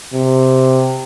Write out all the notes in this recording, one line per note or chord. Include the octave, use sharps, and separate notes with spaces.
C3